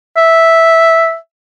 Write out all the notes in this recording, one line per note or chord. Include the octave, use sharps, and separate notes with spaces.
E5